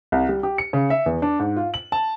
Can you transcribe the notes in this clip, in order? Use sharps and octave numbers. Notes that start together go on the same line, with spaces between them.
C2
G3
G4
C#7
C#3
E5
E2
D4
G#2
F4
F#7
A5